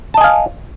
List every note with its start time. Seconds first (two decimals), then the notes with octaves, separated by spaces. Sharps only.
0.14 A5
0.17 D#5
0.21 G#5
0.24 F5